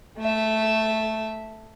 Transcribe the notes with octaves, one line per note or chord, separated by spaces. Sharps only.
A3 E5